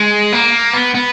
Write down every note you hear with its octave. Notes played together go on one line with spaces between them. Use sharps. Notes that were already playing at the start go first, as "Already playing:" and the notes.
Already playing: G#3
A#3
B3
B3